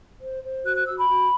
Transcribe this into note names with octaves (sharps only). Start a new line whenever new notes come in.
C5
C5
F#4 F#6
F#6
F#4 E6
B5
F#4